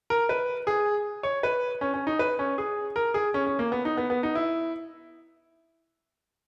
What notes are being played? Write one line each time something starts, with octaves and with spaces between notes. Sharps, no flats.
A#4
B4
G#4
C#5
B4
C#4
C#4
D#4
B4
C#4
G#4
A#4
G#4
C#4
C#4
A#3
B3
D#4
B3
B3
D#4
E4